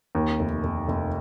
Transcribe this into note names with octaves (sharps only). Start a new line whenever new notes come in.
D#2
F1
F1
F1